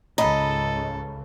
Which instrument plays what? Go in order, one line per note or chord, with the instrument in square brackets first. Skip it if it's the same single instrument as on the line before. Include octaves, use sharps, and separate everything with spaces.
[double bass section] C#2 G#2 C#3 [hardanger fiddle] A4 [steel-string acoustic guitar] D#5 [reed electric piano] A#5 B5